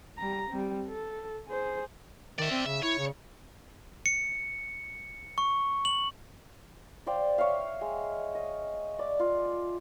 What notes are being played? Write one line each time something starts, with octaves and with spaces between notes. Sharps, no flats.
G3 A#5
G3 C4
A4
G#4 C5
D#3 D5 E5
C4
C#3 E5
E4 C#5
C#3
C#7
C#6
F#7
C5 D5 F5 G5
C#5 E5 F5
G#3
D#5
D5
F4